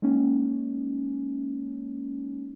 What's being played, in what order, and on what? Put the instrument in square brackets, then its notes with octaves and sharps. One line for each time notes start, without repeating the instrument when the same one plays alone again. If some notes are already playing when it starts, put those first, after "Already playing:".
[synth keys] G#3 A#3 C#4 D#4